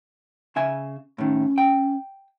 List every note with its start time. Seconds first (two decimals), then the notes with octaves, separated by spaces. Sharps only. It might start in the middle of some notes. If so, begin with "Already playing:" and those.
0.56 C#3 E5 G#5
1.18 A2 D#3 C#4
1.58 G5